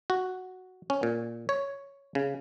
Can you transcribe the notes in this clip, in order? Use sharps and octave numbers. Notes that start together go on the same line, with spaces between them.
F#4
C#4
A#2
C#5
C#3